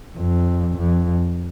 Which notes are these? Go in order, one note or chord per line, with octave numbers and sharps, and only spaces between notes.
F2
F2